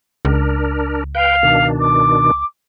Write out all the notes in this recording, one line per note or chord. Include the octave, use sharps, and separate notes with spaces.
C#2 D4 A#4
B4 F5 G5
B2 D#3 D4
D6